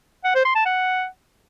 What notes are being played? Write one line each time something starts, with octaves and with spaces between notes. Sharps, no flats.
F#5
C5
C6
A5
F#5